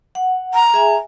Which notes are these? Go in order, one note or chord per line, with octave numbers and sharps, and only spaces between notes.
F#5
A#5
G#4 E5 G#5